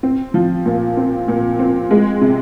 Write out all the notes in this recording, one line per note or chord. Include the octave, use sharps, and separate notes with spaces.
C4
F3
A#2
C4
A#2
C4
G#3
C3